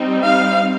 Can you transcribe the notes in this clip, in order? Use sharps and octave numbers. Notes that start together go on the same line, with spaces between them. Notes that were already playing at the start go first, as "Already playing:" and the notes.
Already playing: G3 C4 D#4
F5